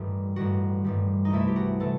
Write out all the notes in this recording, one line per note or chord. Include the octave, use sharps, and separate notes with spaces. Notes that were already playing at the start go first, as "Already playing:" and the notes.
Already playing: A1 G2 D#3 G3 G4
A1 G2 D#3 G3 F#4
A1 G2 D#3 G3
D#4
C2 C3 E3 A3 E4
G4
F#4
C3 E3 A3 A4